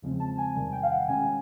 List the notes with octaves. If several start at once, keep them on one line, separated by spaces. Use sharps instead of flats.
E2 C#3 F3 G#3 C4
A5
G#5
E2 C3 D#3 G3 G#5
G5
F5
F#5
B2 G#3 C#4 G#5